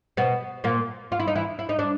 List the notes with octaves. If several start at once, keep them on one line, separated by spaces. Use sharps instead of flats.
B2 B3
A#2 A#3
F4
E4
D#4
E3 E4
E4
D#4
D4